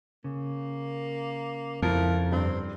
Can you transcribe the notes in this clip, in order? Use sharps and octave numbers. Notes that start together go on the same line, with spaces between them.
C#3 A#3
F2 F3 E4 A#4
G2 C4